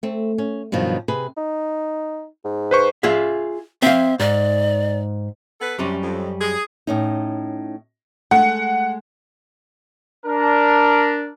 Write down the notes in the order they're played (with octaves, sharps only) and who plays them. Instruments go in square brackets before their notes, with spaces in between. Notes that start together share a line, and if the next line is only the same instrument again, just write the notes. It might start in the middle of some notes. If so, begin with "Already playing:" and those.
[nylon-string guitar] A3 C4
C#4
G2 B2 D#3 F3 F#3
C3 G#4 B4
[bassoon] D#4
G#2
[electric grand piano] B4 C5 C#6
[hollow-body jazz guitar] F4 G#4 E5
[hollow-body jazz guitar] C4 F5 [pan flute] E5
[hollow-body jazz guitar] G#2 [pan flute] D5
[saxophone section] B3 A4 B4
[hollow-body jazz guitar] F#2 G3 C#4 [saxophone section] C3
[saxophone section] F2
G#4
[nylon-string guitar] A2 C#4 D#4
[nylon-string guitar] G#3 A3 [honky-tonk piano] F#5
[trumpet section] D4 A#4